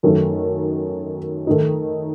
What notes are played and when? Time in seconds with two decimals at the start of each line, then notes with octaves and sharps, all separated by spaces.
0.03 F#2 D#3 A3
1.47 D#3 A3 D#4